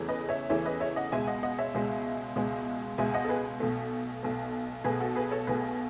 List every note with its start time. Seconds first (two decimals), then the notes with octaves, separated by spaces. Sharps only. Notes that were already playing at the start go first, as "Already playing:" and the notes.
Already playing: E2 C#3 E3 A3
0.09 B4 D#5
0.29 C#5 E5
0.49 E2 C#3 E3 A3 C#5 E5
0.65 B4 D#5
0.80 C#5 E5
0.96 D#5 F#5
1.12 C#2 B2 G#3 E5 G#5
1.27 D#5 F#5
1.43 D#5 F#5
1.58 C#5 E5
1.74 C#2 B2 G#3
2.36 C#2 B2 G#3
2.98 C#2 B2 G#3 E5 G#5
3.13 D#5 F#5
3.25 A4
3.29 G#4 B4
3.60 B1 B2 A3
4.23 B1 B2 A3
4.84 B1 B2 A3 G#4 B4
5.00 F#4 A4
5.15 G#4 B4
5.31 A4 C#5
5.47 B1 B2 A3 G#4 B4